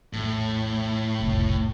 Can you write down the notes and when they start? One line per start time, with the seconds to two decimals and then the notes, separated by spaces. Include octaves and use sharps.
0.13 A#1 E2 A2
1.19 F1 B1